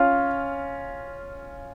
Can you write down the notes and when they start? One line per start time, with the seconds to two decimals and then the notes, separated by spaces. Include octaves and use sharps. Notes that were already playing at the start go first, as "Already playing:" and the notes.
Already playing: C#4 F4